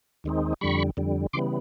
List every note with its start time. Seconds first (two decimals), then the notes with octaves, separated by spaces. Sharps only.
0.24 D#2 D#3 G#3 C4 D#4
0.61 F2 D3 G3 B5 C#6
0.97 F2 D3 G3
1.33 C#3 E3 G3 B3 C6 D6